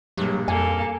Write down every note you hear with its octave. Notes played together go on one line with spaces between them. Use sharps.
A#1 G2 F#3
F2 A#3 A4 G#5